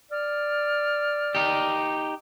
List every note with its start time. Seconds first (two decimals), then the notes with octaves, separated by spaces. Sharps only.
0.11 D5 F6
1.35 D#4 G4